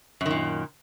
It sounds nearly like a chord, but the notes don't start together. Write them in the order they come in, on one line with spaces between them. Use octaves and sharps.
F#2 D#3 A#2